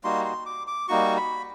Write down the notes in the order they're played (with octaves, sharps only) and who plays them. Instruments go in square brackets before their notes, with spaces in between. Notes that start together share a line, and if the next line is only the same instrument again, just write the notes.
[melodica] G3 A#3 D#4 F#4 C6
C6
D6
D6
G3 A#3 D#4 F#4 C#6
B5